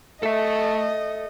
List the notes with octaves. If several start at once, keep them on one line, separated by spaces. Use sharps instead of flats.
A3 A4 D#5 E5